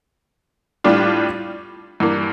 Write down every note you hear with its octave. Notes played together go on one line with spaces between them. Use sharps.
A2 G3 D4 F4
G2 E3 A#3